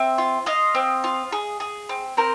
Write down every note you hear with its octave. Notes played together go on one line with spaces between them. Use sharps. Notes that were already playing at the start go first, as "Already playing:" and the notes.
Already playing: C4 E5
F4
F4 D#5 F5
C4
F4
G#4
G#4
C4
C4 A#4 C5